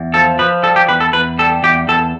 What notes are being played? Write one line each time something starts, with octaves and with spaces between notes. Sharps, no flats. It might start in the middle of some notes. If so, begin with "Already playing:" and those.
Already playing: E2
F3 A4
F3 B4
G3 A4
G4
E2 B4
A4
E2 B4
G3 A4
E2 G4
E2 A4